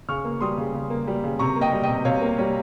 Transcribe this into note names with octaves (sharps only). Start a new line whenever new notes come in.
C#3 C#6 F6
A#3
G3 C6 D#6
C#3
C#3
A#3
G3
C#3
C3 A#5 C#6
A#3
D#5 G5
G3
D#5 G5
C3
C3 C#5 F5
A#3
G3 C#5